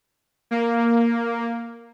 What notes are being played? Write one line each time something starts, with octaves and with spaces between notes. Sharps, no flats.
A#3